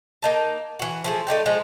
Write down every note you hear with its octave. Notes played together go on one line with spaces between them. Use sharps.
A#3 D#4 A5
E3 F#4
F3 A3 G#4
A3 D#4 D5 G5
F3 G#3 D#4